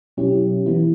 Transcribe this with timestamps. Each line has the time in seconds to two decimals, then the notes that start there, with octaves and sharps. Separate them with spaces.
0.17 B2 F#3 C#4 E4 G4
0.66 E3 B3 E4